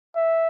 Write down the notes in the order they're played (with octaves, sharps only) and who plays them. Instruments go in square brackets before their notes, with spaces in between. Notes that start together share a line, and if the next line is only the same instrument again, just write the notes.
[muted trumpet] E5